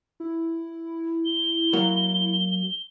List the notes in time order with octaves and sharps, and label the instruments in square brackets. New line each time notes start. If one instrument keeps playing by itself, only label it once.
[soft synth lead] E4
[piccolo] G7
[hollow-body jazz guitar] F#3 A#3 F#4